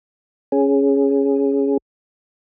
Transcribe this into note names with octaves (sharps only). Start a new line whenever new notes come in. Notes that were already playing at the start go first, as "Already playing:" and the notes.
C#4 G#4